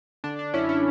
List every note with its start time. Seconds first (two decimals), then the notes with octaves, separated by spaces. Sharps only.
0.24 D3 D4
0.39 D4
0.54 F#2 C#4 E4
0.69 C#4 E4